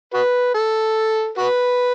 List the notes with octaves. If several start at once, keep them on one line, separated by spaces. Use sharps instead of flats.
F#4 B4
A4
F#4 B4